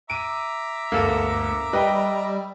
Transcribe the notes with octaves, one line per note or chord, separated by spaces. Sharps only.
E5 A#5 D6 D7 D#7
G1 D2 A#3 A4 D5
G3 B4 D#5 G5 B5